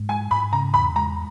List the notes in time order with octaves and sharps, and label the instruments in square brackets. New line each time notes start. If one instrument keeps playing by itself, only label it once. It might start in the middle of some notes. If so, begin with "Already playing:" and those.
Already playing: [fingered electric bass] G#2
[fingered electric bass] G#3 [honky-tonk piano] G#5
[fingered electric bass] G#2 [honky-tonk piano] B5
[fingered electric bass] C#3 [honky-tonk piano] A#5
[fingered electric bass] E2 [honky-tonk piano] B5
[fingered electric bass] G#3 [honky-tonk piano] A#5